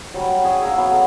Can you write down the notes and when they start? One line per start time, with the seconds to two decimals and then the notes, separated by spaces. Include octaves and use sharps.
0.14 F#3 G3 B5
0.29 G#5
0.43 C#4 G#4 C#5
0.62 F5 F#5 A#5 E6
0.76 F#3 B3
0.91 A4